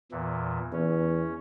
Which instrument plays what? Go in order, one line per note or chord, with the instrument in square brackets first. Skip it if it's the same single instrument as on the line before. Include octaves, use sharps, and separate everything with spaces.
[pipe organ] E2 A#2 E3
[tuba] E2 [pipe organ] C#4